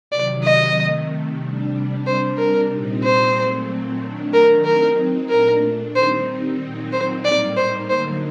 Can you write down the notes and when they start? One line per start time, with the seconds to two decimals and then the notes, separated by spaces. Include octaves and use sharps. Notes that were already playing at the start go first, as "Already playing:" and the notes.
0.12 C3 D#3 F#3 D5
0.44 D#5
0.77 C3 D#3 A3
1.41 C3 G3 D4
2.06 C3 G3 D4 C5
2.38 A#4
2.71 A#2 G3 C4 D#4
3.04 C5
3.36 A#2 F#3 A3 C4
4.01 D#3 F#3 A3 D4
4.34 A#4
4.65 F#3 C4 D#4 A#4
5.30 A#2 A3 D4 A#4
5.95 D#3 G3 C4 D#4 C5
6.59 A#2 F#3 C4 D#4
6.93 C5
7.25 A2 G3 A#3 D#4 D5
7.57 C5
7.90 D3 F#3 A#3 D#4 C5